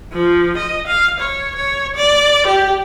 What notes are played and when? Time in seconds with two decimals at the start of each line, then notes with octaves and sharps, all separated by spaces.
0.12 F3
0.57 D#5
0.87 F5
1.20 C#5
1.55 C#5
1.96 D5
2.46 G4